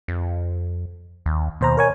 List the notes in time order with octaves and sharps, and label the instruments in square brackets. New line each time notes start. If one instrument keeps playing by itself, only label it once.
[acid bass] F2
D#2
[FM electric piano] D#2 C5 A#5 [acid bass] B2
[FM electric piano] A#4 C#5 G#5